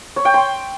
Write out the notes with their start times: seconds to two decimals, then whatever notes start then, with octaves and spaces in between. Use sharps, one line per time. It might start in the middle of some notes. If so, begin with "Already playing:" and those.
0.16 C#5
0.25 G5
0.34 C6